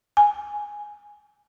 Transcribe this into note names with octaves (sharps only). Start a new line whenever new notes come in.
G#5